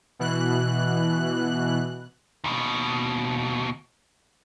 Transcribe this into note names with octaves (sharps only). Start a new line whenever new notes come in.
B2 E3 F#6
D#2 B2